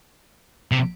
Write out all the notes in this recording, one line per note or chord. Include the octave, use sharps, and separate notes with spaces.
C3